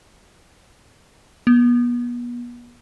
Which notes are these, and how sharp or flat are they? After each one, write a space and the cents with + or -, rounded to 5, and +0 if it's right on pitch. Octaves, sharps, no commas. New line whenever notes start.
B3 -35